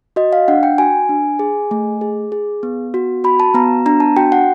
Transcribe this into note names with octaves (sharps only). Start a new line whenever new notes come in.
F#4 D#5
F5
D4 F#5
G5
F#4 G#5
D4
G#4
A3
G#4
G#4
B3
F#4
F#4 B5
A5
B3 A#5
D4 A#5
A5
F#4 G5
F#5